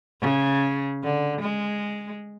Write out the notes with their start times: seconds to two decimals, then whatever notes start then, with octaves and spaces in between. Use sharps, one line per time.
0.21 C#3
1.03 D3
1.41 G#3